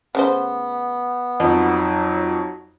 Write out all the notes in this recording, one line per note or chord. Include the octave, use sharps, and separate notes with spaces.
C#3 A3 B3 C5
F2 F#3 D#4 D#5